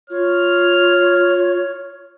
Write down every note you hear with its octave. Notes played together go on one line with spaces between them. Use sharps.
F4 C#5 F6